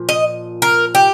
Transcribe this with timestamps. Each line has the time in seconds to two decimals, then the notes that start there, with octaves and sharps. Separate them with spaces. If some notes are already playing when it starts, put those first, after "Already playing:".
Already playing: A#2 F3
0.09 D#5
0.62 A#4
0.95 G4